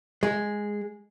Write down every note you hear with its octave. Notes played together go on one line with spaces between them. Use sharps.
G#3